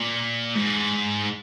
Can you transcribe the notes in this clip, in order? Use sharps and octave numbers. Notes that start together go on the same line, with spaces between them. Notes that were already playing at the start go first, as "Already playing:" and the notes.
Already playing: A#2
G#2